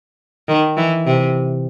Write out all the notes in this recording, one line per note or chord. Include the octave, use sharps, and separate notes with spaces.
D#3
E3
C3